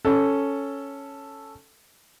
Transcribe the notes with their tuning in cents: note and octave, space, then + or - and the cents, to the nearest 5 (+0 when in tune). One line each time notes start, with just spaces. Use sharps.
C#4 +0 A4 +0